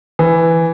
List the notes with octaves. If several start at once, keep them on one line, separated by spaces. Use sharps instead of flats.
E3